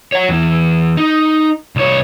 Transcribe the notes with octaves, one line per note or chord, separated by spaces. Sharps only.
C#5 F#5
E2 E3
D#4
C2 C#5